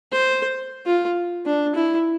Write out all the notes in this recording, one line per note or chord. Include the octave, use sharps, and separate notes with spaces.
C5
F4
D4
E4